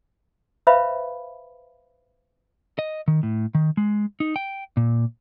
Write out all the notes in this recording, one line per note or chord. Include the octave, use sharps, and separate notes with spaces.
B4 C5 E5 F5 B5
D#5
D#3
A2
D#3
G#3
D#4
G5
A#2